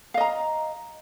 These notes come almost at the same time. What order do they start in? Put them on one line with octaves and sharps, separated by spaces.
F5 D#5 A#5